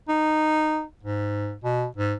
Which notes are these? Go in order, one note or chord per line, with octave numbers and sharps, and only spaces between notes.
D#4
G#2
B2
G#2